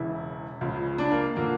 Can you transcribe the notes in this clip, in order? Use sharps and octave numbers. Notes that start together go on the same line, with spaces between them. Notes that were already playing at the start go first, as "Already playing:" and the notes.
Already playing: E1 E2 C#3 E3 E4
C#2 C#3 F3
D4
A#3
D3 F3 A#3